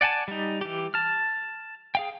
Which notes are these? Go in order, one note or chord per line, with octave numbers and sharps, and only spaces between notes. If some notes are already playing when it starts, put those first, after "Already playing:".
D5 F#5 G#5 A5
G3 D#4
E3 G4
A5 F6
G#4 F5 G5